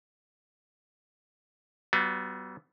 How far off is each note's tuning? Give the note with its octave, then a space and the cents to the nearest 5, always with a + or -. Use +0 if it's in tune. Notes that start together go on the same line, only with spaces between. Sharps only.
G3 -45 B3 +10 F#4 -40